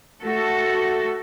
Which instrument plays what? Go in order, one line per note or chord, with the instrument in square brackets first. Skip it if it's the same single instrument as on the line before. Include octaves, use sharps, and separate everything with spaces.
[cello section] A3 F#4 A4